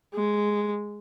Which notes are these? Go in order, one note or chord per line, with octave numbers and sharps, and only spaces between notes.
G#3